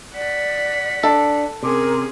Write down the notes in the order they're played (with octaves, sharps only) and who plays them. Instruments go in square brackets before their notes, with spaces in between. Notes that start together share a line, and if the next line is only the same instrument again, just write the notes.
[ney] D5 [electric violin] F#5 B6
[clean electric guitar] D4 [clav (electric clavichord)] A4
[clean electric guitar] C3 [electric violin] C#4 G#4 [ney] A#4